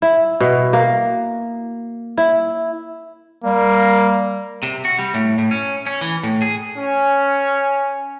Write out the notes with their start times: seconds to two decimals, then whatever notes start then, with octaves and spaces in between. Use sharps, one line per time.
0.02 E4
0.40 B2
0.73 A#3
2.17 E4
3.44 G3 A#3
4.63 C3
4.85 F#4
4.99 G3
5.14 A2
5.38 A2
5.51 C#4
5.86 C#4
6.01 E3
6.23 A2
6.42 G#4
6.77 C#4